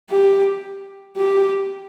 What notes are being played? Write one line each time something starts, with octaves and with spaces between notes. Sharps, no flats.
G4
G4